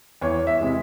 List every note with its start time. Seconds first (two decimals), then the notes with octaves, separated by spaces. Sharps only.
0.21 E2 C#5
0.47 E5
0.60 C3 E3 G#3